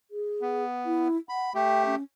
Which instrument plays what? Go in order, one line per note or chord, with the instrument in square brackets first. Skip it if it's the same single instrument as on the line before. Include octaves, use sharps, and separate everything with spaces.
[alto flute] G#4
[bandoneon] B3
[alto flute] E4
[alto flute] F#5 [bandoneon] B5
[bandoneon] A3 G4 [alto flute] G5
[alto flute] C#4